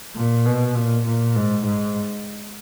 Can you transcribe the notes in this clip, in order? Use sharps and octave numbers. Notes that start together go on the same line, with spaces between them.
A#2
B2
A#2
A#2
G#2
G#2